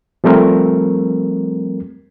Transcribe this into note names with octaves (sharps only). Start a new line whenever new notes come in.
F3 G3 A3 C4 A#4